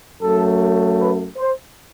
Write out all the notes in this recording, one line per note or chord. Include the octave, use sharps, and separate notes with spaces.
F#2 F#3 A3 A4
B4
C5